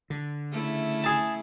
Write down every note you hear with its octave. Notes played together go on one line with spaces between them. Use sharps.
D3
C#3 A3 E4
G#4 A5